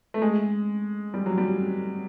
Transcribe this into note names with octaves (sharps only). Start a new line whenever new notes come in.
A3
G#3
G3
F#3
G3